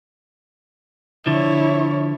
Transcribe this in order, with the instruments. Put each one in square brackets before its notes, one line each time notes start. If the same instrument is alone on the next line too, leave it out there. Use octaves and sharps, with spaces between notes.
[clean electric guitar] D3 F3 [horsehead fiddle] E4 C#5